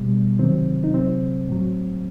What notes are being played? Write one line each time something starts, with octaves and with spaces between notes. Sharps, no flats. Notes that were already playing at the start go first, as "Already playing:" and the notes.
Already playing: B2 G3 B3
C3 D#3 F#3 C4
D#4
C3 F#3 C4
A2 F#3